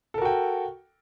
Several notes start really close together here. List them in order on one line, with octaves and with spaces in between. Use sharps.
A4 A#4 F#4 G5